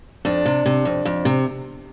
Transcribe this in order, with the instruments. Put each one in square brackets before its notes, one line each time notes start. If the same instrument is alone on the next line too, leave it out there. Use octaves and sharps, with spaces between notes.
[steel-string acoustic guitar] F2 D4
C3
C3
F2
F2
C3